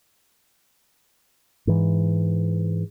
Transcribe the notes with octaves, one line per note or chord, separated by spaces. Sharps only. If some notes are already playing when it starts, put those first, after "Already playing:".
G#2 E3